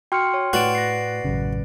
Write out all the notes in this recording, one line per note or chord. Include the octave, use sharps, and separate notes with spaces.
F#4 G5 C6 F6 C#7
C#5
A2 F#4 B4 D5 D7
A#6 C7
A1 F#2 C#3